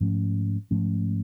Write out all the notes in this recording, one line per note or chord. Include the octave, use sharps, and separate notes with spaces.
G#2 F3 A3 C#4
G#2 F3 A3 C#4